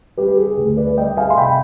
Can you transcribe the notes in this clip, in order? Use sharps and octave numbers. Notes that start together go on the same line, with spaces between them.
G3 G4 B4
G#4
D2
B4 D5
G3 D#5 G5
F5 G#5
C6
C3 G5 B5